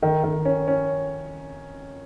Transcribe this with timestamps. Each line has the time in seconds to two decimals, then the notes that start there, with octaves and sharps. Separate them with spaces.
0.02 D#3
0.24 D#3
0.45 C#4
0.68 C#4